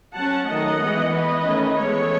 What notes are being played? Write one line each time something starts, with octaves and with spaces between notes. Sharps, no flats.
F#3 C#4 F#5 A5
D#3 F#3 A3 D#5 F#5
E3 G#3 B3
E3 B3 B4 D#5
D#3 A3 C#4
E3 G#3 B3 A4 C#5